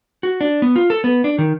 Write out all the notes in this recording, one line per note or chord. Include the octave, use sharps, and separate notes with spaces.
F#4
D4
B3
F4
A4
B3
D4
D#3